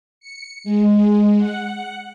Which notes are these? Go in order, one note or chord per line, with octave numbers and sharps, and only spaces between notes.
C#7
G#3
F#5